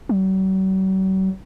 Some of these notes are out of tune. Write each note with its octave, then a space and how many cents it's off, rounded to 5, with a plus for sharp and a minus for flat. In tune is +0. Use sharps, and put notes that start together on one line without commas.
F#3 +45